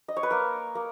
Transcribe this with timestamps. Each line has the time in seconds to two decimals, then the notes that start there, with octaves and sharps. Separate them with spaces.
0.08 D#5
0.17 C#5
0.23 B4
0.30 A#3 A#4
0.75 A#3